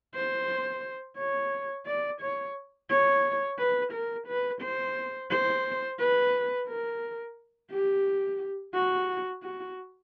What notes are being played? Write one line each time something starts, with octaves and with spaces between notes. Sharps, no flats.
C5
C#5
D5
C#5
C#5
B4
A#4
B4
C5
C5
B4
A#4
G4
F#4
F#4